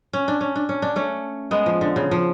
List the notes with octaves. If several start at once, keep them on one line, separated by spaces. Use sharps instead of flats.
C#4
D4
C#4
D4
C#4
D4
A3 C#4
G#3 B3
F3
D3
C#3
F3